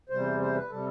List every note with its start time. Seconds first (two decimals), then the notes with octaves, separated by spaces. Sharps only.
0.09 E2 C3 G3 C5
0.40 C5
0.55 B4
0.70 C3 G3 A4